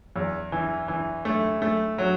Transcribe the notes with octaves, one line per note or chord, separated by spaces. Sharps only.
E2
E3
E3
A3
A3
F#3